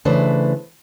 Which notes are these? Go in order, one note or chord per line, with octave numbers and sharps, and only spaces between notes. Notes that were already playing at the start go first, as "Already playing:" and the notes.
C#3 E3 A3 D4 B4 C5